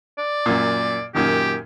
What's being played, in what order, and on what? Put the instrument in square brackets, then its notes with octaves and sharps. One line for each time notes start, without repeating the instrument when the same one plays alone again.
[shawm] D5
[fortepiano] F#2 A#2
[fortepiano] F#2 A#2 D#3 [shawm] G4